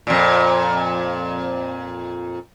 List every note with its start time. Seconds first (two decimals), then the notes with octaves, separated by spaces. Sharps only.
0.07 F2 A#2